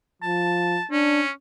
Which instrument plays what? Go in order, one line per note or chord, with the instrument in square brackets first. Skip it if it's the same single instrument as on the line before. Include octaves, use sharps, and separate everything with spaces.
[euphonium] F3 [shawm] A5
[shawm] C#4 [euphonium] D4